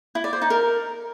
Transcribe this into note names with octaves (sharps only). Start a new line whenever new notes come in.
E4
D5
C5
D#4
A#4